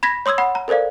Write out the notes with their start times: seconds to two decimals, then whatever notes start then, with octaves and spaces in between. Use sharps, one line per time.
0.03 B5 G#6 A#6 B6
0.26 C#5 C6 D#6 E6 G#6
0.38 F#5 B5
0.55 A#5
0.68 A4 A#4 C5 D5 F5